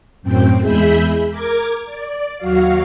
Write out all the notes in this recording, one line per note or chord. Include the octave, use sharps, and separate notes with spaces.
F#2 A2 C4 G5
E2 G#3 G#4 E5 B5 G6
A#4 D6 G#6
D5
D#2 F#3 F#4 F5